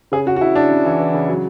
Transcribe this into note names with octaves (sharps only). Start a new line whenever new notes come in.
C#3 G#4
C#3 F#4
F#4
C#3 E4
C#3 D4
C#3
E3
E3
C#3
F#3